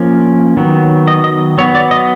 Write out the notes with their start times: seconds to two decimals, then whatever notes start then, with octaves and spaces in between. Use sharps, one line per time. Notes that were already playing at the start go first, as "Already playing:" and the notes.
Already playing: F3 A#3 C#4
0.57 D#3 F#3 B3
1.07 D#5
1.24 D#5
1.58 F#3 B3 C#5
1.75 D5
1.91 D#5